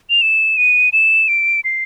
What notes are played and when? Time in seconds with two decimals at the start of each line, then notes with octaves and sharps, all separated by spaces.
0.10 F7
0.22 E7
0.57 D#7
0.93 E7
1.28 D7
1.64 C7